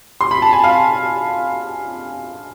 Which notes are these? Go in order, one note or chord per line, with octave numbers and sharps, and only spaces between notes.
C6
B5
A5
G#5
F5